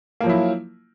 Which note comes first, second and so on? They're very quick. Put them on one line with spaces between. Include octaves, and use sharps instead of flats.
A#3 F3 F#3 E4